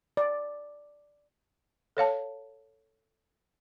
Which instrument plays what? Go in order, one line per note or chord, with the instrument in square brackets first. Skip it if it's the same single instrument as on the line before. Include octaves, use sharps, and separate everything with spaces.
[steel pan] D5
[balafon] A4 C#5 F5 A5